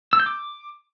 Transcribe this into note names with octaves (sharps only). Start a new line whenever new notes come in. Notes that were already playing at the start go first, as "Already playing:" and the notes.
E6
G6
D6